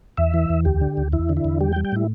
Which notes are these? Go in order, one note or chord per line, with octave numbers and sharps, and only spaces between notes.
E2 E5
E3
E2
D2 G4
D3
D2
E2 E4
D3
E4
E2
G3 G4
G5
G3
G5
A2 E4